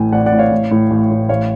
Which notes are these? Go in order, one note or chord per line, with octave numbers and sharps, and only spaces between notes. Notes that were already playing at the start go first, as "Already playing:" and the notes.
Already playing: A1 A2 G#5
A1 D5 F#5
D5 F#5
A2
C#5 F5
A1
A2
A1
A2
A1 C#5 F5